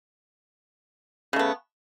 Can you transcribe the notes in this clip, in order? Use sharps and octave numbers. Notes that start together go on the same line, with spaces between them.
C#3 A3 B3